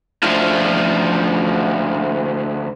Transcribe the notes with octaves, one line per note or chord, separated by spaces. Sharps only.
D2 F3